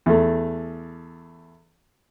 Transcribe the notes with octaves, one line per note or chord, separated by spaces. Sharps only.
E2 A3